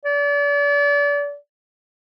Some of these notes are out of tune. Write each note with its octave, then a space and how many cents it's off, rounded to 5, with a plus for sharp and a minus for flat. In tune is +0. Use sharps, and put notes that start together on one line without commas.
D5 -35